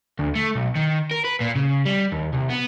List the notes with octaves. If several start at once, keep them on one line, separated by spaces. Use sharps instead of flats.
D2
A3
B1
D#3
A#4
B4
A#2
C#3
G3
D#2
C2
B3